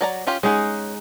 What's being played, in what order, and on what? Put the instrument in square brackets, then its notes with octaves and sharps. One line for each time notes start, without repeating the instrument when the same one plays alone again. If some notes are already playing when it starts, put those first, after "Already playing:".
[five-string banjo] F#3 D5 A#5
C#4 F4 G4
[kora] G#3 D#4 F#5 [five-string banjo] C#4 G#4